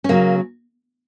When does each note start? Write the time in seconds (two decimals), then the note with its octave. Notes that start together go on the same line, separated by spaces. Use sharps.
0.04 C#4
0.09 C#3 F#3 A#3